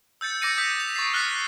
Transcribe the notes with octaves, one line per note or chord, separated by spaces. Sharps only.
E6 G6 A6 C#7
D6 E6 A#6 C#7 D#7
D#6 G6 B6
F7
C#6 A6 C7 F7
F6 F#6 A6 B6 C#7